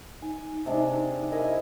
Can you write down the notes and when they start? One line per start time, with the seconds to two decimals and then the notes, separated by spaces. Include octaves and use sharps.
0.22 D#4 G#5
0.66 C3 G#3 D4
1.32 E4 G#4 A#4 D#5